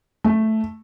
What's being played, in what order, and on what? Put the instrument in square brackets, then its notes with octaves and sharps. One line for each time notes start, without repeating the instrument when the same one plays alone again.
[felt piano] A3